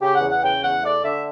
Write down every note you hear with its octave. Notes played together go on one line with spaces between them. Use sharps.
C#3 G4
F#5
E2
F#5
C#3 G5
E2 F#5
A3 D5
D3 E5